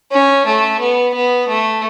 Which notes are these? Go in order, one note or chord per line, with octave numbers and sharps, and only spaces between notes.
C#4
A3
B3
B3
A3